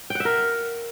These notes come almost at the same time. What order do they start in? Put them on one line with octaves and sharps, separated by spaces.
G5 F#5 E5 A#4